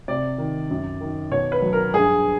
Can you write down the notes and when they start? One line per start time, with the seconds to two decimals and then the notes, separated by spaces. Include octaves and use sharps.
0.08 C3 D5
0.38 D#3
0.70 F#2
1.01 D#3
1.31 B2 C#5
1.52 B4
1.62 F#3
1.73 A#4
1.93 G2 G#4